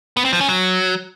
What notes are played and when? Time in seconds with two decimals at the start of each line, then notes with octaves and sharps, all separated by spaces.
0.17 B3
0.25 C4
0.33 F3
0.41 C#4
0.49 F#3